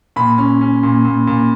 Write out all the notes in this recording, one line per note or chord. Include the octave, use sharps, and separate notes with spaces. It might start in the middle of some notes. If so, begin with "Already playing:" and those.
A#2 B5
C#4
C#4
A#2
A#2
A#2